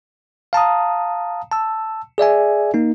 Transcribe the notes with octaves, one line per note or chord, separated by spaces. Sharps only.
F5 A5 A#5 D#6
A5 E6
G#4 D5 E5 G#5
A#3 D#4